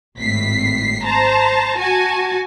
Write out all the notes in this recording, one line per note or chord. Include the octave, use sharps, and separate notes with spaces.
G#1 A2 B6 C7
C5 A5 A#5
F#4 G#5 A5